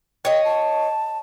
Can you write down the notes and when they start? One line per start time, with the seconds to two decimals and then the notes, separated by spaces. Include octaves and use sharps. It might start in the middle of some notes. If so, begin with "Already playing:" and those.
0.25 C#5 D#5 G5
0.45 A5